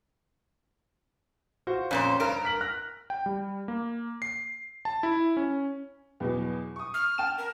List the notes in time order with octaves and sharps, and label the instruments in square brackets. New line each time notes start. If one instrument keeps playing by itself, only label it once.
[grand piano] F4 F#4 C5
[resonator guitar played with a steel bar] F2 A#2 C5 [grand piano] C#4
[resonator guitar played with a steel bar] G2 A#4 [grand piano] D7
[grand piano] B6 F#7
F6 F#6 A#6
[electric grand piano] G5
G3
A#3
C7
A5
E4
C#4
[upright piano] E2 B2 F#3
C#6 D#6
[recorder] F6
[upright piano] G5 A5 E7
[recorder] A#4